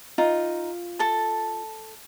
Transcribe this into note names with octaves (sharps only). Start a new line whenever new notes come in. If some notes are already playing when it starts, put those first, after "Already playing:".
D#4 F4
A4 A5